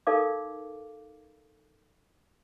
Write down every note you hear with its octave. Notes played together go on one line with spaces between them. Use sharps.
D#4 A4 A#4 D5 F5 D6